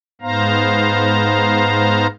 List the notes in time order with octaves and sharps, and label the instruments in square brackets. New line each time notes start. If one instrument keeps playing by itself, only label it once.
[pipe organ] G#2 B3 C5 F5 A#5